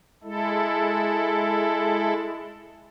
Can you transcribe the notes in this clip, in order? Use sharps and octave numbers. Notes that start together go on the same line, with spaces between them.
G#3 E4 A4